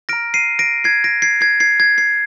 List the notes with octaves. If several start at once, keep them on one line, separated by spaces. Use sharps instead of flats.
A#5 F6 A#6 D7
C7 D#7
A#6 D7
G#6 C7
A#6 D7
G#6 C7
G#6 C7
G#6 C7
G#6
G#6 C7